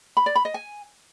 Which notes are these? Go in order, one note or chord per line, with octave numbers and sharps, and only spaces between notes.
B5
D5
B5
D#5
G#5